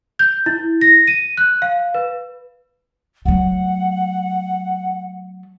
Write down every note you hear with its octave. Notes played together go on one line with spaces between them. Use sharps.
G6
E4
A#6
D#7
F#6
F5
B4
F#3 A3 F#5